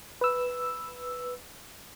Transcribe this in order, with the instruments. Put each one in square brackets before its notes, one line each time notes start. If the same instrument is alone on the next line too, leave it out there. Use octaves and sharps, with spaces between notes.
[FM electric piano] B4 E6